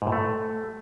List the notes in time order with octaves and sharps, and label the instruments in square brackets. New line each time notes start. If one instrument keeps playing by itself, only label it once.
[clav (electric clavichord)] G#2
A2
A3